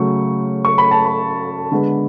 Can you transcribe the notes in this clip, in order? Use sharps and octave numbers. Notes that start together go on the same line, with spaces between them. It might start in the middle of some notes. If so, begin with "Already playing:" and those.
Already playing: C#3 F#3 A3 C#6
C#6
B5
A5
B5
D3 G#3 B3